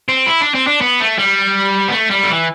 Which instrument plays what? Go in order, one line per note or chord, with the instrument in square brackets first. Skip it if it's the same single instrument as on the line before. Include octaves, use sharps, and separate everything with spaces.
[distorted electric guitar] C4
E4
D4
C4
D4
B3
A3
G3
B3
A3
G3
D3
E3